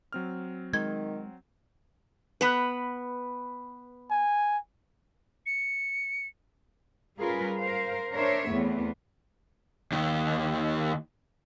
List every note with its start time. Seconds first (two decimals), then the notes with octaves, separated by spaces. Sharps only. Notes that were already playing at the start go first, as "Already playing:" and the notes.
0.13 F#3 C4 F6
0.73 D#3 G#3 G#6
2.41 B3 B4
4.11 G#5
5.46 C#7
7.17 G3 C#4 F4 G#4 A#4 B4
7.59 A#4 C5 F5
8.13 D4 A#4 C5 C#5 E5
8.49 E2 A3 B3 C4
9.92 D#2 D#3